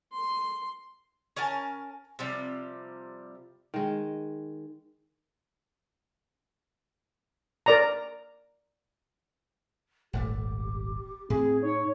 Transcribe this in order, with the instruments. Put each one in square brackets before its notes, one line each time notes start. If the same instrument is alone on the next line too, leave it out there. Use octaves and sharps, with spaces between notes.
[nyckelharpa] C6
[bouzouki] C#4 A#4 G#5 A5
C3 F3 G3
[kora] D#3 G#3
[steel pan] A#4 D5 A#5
[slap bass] D#1 G#1 A3 [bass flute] G4
[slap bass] A2 [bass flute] C4 [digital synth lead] G#4
[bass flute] D#4 [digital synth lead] C#5